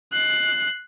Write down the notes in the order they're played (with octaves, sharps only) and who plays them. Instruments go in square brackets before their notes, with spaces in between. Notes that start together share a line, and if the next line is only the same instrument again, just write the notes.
[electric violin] F#6 C7